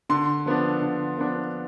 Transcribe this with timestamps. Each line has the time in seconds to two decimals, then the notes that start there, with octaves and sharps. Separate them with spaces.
0.09 D3 C6
0.46 F3 B3 D4
0.82 D3
1.18 F3 B3 D4